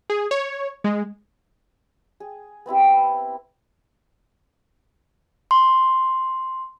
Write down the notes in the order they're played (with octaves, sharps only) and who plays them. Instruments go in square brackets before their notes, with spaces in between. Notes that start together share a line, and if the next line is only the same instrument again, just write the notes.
[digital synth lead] G#4
C#5
G#3
[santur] G#4
B3 C4 E4 G4
[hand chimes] C6